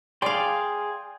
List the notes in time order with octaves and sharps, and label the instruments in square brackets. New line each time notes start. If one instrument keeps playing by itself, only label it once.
[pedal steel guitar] G#4 G5 C6 [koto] D5 F5